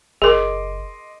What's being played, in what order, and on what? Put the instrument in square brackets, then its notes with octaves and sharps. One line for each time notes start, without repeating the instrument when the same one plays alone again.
[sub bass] F#1 [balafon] G#4 A#4 [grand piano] D#5 C6 D6